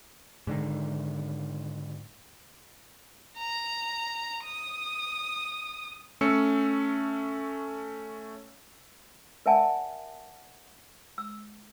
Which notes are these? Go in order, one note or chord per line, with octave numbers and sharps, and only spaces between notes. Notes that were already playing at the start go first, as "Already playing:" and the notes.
G#2 D3 D#3
A#5
D#6
A3 C#4 E6 C#7
A#4 D5 E5 F#5 G#5 A5
E6